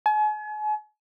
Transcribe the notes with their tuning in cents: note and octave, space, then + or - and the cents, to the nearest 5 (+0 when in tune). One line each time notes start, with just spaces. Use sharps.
G#5 +40